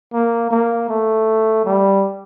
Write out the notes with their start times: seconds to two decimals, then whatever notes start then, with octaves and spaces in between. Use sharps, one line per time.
0.13 A#3
0.51 A#3
0.89 A3
1.65 G3